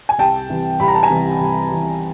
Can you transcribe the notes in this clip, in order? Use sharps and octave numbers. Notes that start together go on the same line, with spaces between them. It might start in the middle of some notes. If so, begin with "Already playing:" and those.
G#5
C2 G5 A5
C3 E3 G3
C2 B5
A#5
A5
G#5 A#5
C3 E3 G3
C2
C3 E3 G3